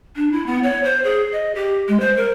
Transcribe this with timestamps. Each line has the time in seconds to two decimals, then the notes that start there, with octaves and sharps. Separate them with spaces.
0.16 D4
0.32 E4
0.46 B3
0.63 C#5
0.84 C5
1.04 G#4
1.32 D#5
1.55 G4
1.88 G#3
2.00 C5
2.17 A#4